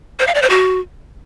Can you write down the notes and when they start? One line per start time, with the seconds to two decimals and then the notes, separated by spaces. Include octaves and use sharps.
0.20 C5
0.27 F5
0.35 D5
0.42 C5
0.50 F#4